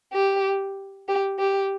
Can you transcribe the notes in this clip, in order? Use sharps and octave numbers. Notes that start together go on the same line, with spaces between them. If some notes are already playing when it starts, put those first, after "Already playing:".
G4
G4
G4